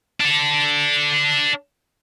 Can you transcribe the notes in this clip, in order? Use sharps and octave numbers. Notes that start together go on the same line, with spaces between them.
D4 A4